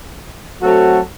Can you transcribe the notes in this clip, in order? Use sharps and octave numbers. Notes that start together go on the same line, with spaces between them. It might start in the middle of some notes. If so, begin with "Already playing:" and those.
F#3 A3 C4 F#4 A4